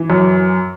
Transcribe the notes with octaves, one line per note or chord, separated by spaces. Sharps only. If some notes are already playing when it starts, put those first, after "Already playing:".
Already playing: E3
F#2